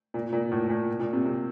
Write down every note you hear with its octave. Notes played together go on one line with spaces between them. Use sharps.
A#2
A#2
A2
A#2
A#2
C3
C3